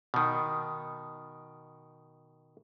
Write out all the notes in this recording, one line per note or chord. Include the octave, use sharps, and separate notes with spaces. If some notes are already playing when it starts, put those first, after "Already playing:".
B2 D#3